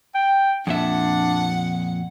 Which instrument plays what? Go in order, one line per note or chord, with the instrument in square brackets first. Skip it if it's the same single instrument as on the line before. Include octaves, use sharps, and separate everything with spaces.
[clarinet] G5
[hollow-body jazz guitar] F2 A#2 E5 [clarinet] D4 [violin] F#5